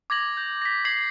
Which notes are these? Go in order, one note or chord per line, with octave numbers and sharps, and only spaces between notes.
D6 G#6 A#6 F#7
G6
A#6 B6
D6 G#6 C7 F#7